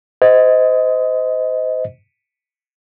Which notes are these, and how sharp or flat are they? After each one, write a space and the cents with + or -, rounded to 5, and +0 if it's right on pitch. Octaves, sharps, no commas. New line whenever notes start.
C5 -30 D#5 +15